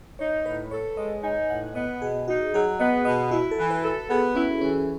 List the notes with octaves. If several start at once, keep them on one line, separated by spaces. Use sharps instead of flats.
D#4 C#5
A2 B4
A4 C#5
G#3 D#5
D#4 G#5
A2 F#5
B3 D#5
B2 G#4
D#4 F#4
F#3 G#4
B3 D#5
B2 D#5
E4 F#4
A4
E3
B4
A4
B3 G#4
C#4 E4
E3 C#4